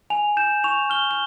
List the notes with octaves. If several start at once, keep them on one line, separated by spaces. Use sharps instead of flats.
G#5 F7
G6 E7
C#6 F7
F6 G7
G7